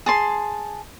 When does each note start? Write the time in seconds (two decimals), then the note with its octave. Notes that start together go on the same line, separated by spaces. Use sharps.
0.06 G#4 A5 C6